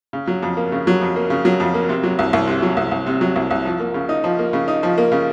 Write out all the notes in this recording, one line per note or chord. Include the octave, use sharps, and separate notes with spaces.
C#3
F#3
F2
A#3
C#3
F#3
F2
A#3
C#3
F#3
F2
A#3
C3
F#3
C2
C2
C3
F#3
C2
C2
C3
F#3
C2
C2
F3
A#3
C#3
D#4
F3
A#3
C#3
D#4
F3
A#3
C#3